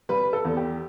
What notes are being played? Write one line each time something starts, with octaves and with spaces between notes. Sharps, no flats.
G3 B4
A4
E2
G4